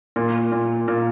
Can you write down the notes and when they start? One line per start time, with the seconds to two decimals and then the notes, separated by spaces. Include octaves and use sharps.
0.16 A#2
0.52 A#2
0.88 A#2